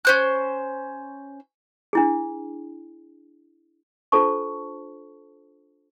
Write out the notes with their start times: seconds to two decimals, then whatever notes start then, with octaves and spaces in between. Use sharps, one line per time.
0.05 C#4 C5 F#6
1.93 D4 E4 G#4
4.12 D4 F4 A4 C5 A5 C#6